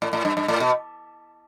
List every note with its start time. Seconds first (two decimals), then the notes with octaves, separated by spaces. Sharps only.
0.02 A2
0.13 A2
0.25 G2
0.37 G2
0.48 A2
0.60 B2